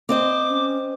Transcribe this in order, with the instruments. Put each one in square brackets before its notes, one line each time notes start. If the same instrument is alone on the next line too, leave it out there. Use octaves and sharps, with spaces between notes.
[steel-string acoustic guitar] C4 C5 D#5 [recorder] D6
[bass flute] C#4